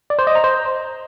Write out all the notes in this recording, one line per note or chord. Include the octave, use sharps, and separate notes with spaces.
D5
C5
D#5
A#5
C5